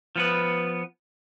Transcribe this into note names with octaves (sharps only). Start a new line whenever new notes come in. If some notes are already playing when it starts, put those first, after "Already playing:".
F3 B3 B4